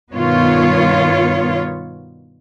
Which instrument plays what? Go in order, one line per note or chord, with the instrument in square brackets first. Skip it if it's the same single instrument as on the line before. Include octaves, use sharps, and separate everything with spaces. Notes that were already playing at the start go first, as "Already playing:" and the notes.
[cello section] G2 B2 D#3 B3 F4 C#5